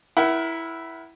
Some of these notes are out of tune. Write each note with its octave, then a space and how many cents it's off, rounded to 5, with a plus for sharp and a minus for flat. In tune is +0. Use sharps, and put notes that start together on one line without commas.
E4 +0 A#4 +35 F#5 +30